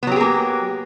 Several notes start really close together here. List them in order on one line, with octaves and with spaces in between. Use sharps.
B3 F#3 G4 G#4 A#3